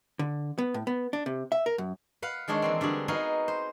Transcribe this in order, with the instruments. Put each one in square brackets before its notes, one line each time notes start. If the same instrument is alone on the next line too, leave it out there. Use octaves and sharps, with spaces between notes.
[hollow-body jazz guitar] D3
B3
A2
B3
D4
C3
E5
A#4
F#2
[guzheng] B4 F5 F#5
D#3 G#3 D4 G#4 C#5
E3 A#3 C4
D3 G3 F#4 G#4
B3 D#4 F#4 G#4 A#4 F5
C5